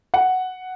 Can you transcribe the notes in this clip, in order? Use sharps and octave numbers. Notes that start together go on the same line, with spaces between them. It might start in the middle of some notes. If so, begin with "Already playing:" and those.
F#5